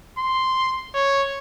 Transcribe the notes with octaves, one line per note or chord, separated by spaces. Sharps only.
C6
C#5